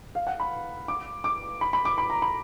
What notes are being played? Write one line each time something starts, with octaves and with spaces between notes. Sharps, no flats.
F5
F#5
B5
D6
D6
B5
B5
D6
B5
A#5
B5